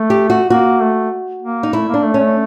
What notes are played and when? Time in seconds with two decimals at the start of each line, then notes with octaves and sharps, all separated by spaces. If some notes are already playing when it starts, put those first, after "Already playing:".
Already playing: A3
0.10 G4
0.30 F#4
0.50 A#3 F#4
0.82 A3
1.42 A#3
1.63 D#4
1.73 A3 E4
1.89 A#3 D4
2.04 A3
2.14 C#4
2.19 A3